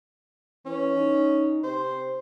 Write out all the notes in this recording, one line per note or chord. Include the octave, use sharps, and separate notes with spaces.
E3 C#4
D#4
C3 C5